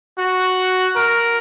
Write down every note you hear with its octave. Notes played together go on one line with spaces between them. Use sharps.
F#4
A#4